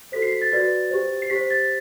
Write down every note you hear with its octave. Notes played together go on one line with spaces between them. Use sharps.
F#4 A4 C5 B6
C7
B6
A6
F#4 B4 D5 A6
G4 C5
C7
G4 C5 B6
A6